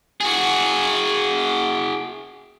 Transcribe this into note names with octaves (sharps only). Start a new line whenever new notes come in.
F#4 G#4